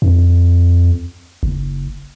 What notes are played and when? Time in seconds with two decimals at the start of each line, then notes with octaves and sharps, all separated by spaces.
0.02 F2
1.43 F#1